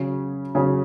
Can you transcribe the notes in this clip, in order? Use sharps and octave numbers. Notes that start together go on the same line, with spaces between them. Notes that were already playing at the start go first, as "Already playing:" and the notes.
Already playing: C#3 F#3 C#4
C#3 F#3 C#4